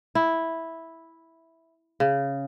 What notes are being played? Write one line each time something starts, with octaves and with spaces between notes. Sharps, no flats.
E4
C#3